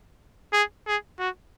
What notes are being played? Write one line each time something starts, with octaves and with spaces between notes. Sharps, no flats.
G#4
G#4
F#4